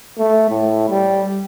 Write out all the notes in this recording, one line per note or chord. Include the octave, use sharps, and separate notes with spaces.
A3
A2
G3